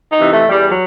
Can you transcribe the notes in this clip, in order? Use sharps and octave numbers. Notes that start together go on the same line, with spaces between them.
D#4
C3 E3
A3
E2 G3
F#3